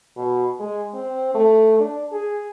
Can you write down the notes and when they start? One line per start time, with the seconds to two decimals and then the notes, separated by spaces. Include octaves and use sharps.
0.17 B2
0.60 G#3
0.94 C4
1.35 A3
1.80 D4
2.12 G#4